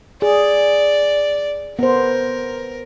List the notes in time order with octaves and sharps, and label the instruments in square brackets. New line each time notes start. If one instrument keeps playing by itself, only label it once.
[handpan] G#4 [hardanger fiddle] D5
[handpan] B3 C5 [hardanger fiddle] A#4